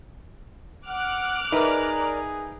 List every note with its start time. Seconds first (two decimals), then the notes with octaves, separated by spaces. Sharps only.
0.88 F#5 D6 F6 F#6
1.52 D#4 G#4 A#4 B4 D5 E5 A#5